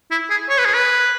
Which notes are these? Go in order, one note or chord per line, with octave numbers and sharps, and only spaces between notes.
E4
G#4
C#5
B4
G#4
B4